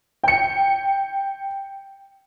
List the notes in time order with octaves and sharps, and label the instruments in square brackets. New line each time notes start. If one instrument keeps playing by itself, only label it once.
[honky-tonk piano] G5 C#7